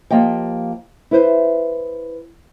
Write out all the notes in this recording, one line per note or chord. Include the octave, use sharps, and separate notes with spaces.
F3 A#3 G4 D#5 G5
E4 B4 C5